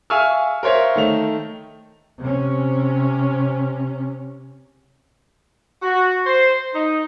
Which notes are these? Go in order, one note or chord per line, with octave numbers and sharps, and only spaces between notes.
E5 F5 G#5 C#6 E6 F6
A#4 C5 C#5 E5 F5
D#3 A3 F7
C3 C#4
F#4
C5
D#4